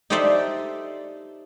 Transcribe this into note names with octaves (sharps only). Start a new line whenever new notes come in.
D#4 G4 A4 C5 D5 E5